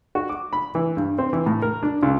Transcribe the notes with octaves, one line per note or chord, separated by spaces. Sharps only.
F#4
D6
B5
E3
G2
C4
E3
A2
A#4
D4
C#2